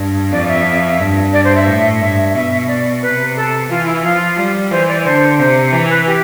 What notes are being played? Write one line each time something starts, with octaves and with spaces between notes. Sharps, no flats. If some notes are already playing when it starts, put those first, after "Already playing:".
Already playing: G2
F2 D5
E5
G2
D5
C5
E5
A2
G2 E5
B2 E5
D5
C3 B4
A4
E3 F4
E4
F3 F4
G3
E3 C5
D5
D3 C5
C3 C5
E3
B4
G4